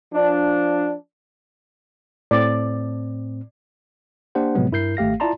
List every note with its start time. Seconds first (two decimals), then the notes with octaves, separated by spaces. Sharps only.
0.14 F3 D4
2.31 A2 C4 D5
4.35 A#3 D4 G4 C5 F#5
4.55 A2 C3 F3 F#3 G#3 B3
4.72 G2 E4 A#4 G6 C7
4.97 G#1 A3 G4 F5 A#6
5.20 E4 F4 D5 A5 A#5 C6